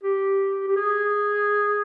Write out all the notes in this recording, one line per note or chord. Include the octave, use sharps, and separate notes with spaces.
G4
G4
G#4